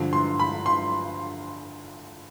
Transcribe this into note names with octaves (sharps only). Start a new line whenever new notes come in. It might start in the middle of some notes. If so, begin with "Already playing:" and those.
Already playing: G2 D3 F3
C6
B5
C6